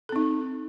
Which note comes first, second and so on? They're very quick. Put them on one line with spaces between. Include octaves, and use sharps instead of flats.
A4 C4 D#4